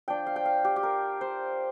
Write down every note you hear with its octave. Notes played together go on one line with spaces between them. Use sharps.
F3 D4 F4 G5
F5
G5
F5
G4
G4
A#4
C5